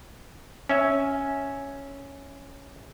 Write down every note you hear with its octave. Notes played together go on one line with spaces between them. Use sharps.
C#4 E5 G#5